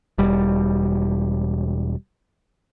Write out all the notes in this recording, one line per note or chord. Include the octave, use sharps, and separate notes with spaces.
E1 G3